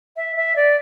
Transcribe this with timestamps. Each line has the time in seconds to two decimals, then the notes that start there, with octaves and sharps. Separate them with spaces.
0.16 E5
0.36 E5
0.55 D5